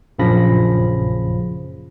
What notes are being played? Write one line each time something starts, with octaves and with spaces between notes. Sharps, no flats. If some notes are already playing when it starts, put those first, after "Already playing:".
A#1 F#2 C#3 F3 B5 A#6